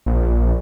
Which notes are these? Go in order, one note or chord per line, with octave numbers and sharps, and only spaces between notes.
A#1